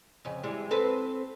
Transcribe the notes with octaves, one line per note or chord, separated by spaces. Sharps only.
F2 C#3
E3 G3 G#3
C4 A4 B4